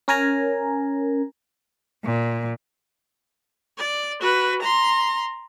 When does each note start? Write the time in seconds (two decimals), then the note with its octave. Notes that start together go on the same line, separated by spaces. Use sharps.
0.08 C#4 A#4 G#5 A#5
2.04 A#2
3.78 D5
4.21 F#4 B4
4.62 A#5 C6